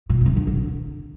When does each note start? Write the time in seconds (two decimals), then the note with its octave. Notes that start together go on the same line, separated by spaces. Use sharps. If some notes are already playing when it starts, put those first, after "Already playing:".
0.09 A#2
0.21 A#2
0.26 C3
0.36 D3
0.47 D3
0.57 D3